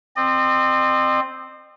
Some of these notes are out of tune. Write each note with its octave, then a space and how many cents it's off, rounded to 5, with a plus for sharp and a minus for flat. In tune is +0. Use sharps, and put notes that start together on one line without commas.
C4 +0 D#5 -40